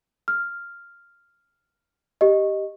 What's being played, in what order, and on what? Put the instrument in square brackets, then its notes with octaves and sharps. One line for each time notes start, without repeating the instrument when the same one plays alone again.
[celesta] F6
G4 D#5